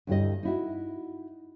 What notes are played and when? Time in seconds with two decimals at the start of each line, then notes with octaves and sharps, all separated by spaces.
0.07 D2 G2 E4 G4 D#5
0.43 D#4 E4 F#4